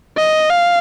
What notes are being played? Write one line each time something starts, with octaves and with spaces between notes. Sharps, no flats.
D#5
F5